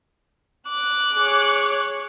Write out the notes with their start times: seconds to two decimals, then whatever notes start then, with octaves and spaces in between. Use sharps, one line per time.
0.69 D6 F#6
1.16 G#4 C#5